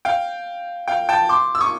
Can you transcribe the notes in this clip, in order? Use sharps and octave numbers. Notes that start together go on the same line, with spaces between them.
F5 G5
F5 G5
G5 A5
C6 D6
E6
C#6 D#6